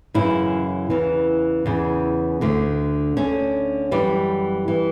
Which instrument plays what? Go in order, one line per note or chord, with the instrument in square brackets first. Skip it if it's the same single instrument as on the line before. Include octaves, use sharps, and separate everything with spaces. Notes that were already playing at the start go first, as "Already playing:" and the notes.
[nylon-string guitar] F#2 C#3 E3 E4
E2 C#3 E3
E2 C#3 E3
D2 D3
D2 D3 C#4
F#2 E3 G3
E3